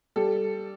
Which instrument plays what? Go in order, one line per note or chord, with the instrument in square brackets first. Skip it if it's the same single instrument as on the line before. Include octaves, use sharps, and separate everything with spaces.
[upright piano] G3 A4